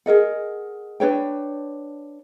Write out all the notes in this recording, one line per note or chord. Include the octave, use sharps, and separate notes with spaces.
G#4 A#4 D#5 F#5
D4 B4 C#5 G5